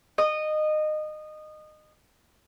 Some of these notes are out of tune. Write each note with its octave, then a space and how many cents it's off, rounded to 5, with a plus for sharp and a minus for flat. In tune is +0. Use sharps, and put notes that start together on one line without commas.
D#5 -20